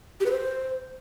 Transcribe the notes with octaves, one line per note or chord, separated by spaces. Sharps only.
G4
B4
C5